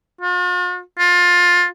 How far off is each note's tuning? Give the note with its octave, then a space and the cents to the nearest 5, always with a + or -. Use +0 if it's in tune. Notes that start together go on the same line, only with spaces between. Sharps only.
F4 +45
F4 +20